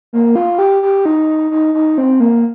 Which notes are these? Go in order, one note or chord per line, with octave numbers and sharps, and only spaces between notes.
A#3
F4
G4
G4
D#4
D#4
D#4
C4
A#3